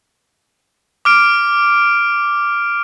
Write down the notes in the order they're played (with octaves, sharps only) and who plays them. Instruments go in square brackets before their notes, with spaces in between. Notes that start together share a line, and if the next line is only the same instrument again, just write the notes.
[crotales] D6 F6 D7